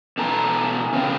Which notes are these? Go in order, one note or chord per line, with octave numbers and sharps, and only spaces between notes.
B2 E3 A4 A#5
C#3 B3 C4